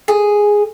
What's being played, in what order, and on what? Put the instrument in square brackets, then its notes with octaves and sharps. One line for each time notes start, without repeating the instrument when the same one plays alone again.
[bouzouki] G#4